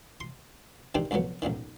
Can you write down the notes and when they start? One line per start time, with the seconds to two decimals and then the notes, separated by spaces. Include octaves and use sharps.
0.20 C6
0.95 C3 D#3 C4 D4 G4
1.11 C2 F2 A#2 F#3 B3
1.42 B1 F#2 A#2 D#3